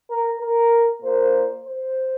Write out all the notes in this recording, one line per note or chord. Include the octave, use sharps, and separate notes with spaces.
A#4
A#4
A#2 A#3 C5
C5